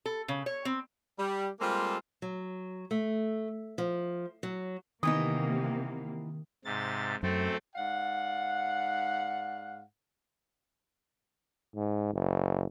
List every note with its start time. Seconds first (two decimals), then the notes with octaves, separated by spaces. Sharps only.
0.06 A4
0.28 C#3
0.46 C#5
0.65 C4
1.19 G3
1.60 G3 G#3 A#3 C4 F4 A4
2.22 F#3
2.91 A3
3.78 F3
4.43 F#3
5.03 C3 D#3 E3 A#3 B3 D#4 D#6
6.65 G#2 C3 A6
7.23 F#2 A3 C4 A4
7.76 G#2 D5 F5 F#5
11.75 G#2
12.13 F#1